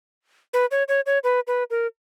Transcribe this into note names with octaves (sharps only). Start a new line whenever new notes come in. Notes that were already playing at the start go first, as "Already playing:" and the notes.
B4
C#5
C#5
C#5
B4
B4
A#4